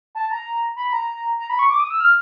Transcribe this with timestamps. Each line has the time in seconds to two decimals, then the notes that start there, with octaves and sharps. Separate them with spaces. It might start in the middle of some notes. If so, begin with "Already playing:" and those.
0.15 A5
0.31 A#5
0.76 B5
0.93 A#5
1.39 A#5
1.50 B5
1.59 C#6
1.70 D6
1.80 D#6
1.90 E6
2.00 F6